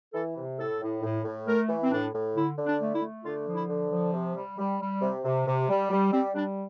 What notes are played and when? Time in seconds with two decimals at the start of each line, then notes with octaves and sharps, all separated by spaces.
0.14 E3 A4
0.37 C3
0.58 A2 A4
0.81 A2
1.03 A2
1.25 A2
1.47 A3 A#4
1.69 E3
1.83 C4
1.91 A2 D4
2.14 A2
2.36 D3 E4
2.58 D3
2.66 D4
2.80 A3
2.94 E4
3.02 A3
3.24 D3 F4
3.47 F3
3.53 E4
3.68 D3
3.91 F3
4.13 C3
4.35 G3
4.58 G3
4.80 G3
5.02 C3
5.24 C3
5.46 C3
5.69 G3
5.90 G3
6.12 G3 C4
6.35 G3 D4